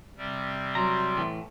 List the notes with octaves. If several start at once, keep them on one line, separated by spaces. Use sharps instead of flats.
C3 G3 C4
F#3 A#5 C6
A2 E3